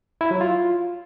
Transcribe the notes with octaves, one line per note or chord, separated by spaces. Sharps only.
E4
F#3
F4